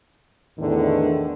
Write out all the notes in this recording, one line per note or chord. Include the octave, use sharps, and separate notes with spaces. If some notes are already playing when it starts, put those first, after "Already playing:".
E2 A2 D3 D#3